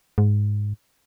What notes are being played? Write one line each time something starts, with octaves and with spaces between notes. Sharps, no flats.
G#2